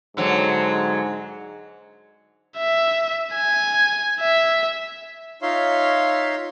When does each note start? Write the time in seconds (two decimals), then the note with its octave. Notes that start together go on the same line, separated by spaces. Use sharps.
0.17 G#2 D3 F#3 C4
2.58 E5
3.35 G#5
4.20 E5
5.42 D#4 F4 C#5 E5 F5 C6